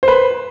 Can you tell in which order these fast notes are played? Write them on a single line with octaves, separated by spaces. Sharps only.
C5 B4 B5